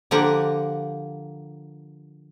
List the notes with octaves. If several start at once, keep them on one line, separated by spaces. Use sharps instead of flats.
D3 F3 A#3 G4 F#5 A#5